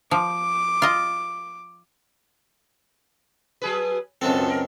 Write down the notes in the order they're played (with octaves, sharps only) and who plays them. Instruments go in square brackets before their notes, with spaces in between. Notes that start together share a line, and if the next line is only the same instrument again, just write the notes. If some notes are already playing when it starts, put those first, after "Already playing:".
[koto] F3 [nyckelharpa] D6
[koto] F4 D#5
[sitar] F#3 G#4 B4
[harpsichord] C#2 F#2 C4 [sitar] B2 F4 A4
[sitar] A#4